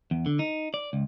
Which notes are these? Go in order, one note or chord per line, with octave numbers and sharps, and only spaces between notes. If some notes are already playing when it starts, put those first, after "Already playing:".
E2
D3
D#4
D5
C#2